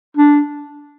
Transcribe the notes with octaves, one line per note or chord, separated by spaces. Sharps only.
D4